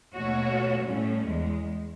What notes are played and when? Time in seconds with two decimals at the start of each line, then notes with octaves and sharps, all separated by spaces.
0.15 D#2 B2 A3 F#4 C#5
0.84 A2 G3 A3 C#4
1.25 E2 G#3